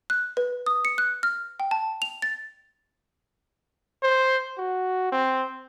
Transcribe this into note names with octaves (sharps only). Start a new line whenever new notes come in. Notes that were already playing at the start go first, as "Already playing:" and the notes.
F#6
B4
D#6
C#7
F#6
F6
G5
A5
F7
A6
C5
F#4
C4